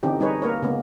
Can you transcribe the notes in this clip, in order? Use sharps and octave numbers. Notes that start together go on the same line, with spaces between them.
D3 E3 C4 C#4 D#4 G4
G3 D#4 G#4 B4 C#5
A#3 A#4 B4 C#5
C#3 G#3 A#3 B3 C#4